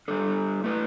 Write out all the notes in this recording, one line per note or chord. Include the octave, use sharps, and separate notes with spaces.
G3 D4 A4
A3 E4 B4